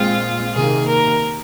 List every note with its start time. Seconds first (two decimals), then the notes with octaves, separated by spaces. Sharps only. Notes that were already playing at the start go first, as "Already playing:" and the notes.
Already playing: A#2 G#3 C4 F4
0.53 C3 D#3 A#3 G#4
0.87 A#4